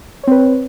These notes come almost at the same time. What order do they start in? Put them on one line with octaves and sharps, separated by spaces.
C#5 C4 B4